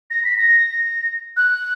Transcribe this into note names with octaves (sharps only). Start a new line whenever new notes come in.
A#6
B6
A#6
F#6